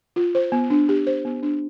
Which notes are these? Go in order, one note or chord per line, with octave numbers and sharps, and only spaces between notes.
F4
C5
B3
D4
G4
C5
B3
D4